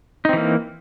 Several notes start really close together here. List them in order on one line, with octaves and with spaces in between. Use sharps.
D#4 C4 E3 A#3